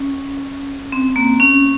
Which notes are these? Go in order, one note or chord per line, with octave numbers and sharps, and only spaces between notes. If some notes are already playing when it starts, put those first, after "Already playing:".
Already playing: C#4
C4
A#3
C#4